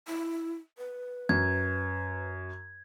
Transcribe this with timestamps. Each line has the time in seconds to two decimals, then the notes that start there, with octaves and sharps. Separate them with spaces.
0.08 E4
0.78 B4
1.29 F#2 G#6